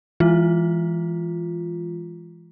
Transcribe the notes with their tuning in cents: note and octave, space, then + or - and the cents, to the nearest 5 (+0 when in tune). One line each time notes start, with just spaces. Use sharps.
E3 +20 G#3 -5 F4 +0